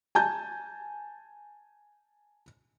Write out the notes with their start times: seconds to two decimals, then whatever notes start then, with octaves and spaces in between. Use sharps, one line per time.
0.15 G#5 A5 G6